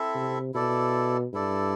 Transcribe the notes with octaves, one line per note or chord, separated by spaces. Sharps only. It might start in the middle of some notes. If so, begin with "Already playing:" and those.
Already playing: C4 E4 A4 E5
C3
B2 E4 A4 D5
G2 E4 A4 D5